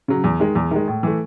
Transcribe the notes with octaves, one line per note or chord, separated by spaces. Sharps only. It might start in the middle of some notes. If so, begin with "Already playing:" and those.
C#3 F#3
E2
D#3 G#3
E2
D#3 G#3
A2
E3 A3